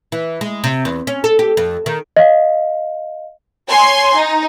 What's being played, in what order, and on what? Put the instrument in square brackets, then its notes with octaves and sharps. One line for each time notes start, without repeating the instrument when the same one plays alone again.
[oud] E3
G#3
C3
E2
C#4
A4
G4
F2
D#3
[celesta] D#5 F5
[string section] C#5 G#5 C6
D#4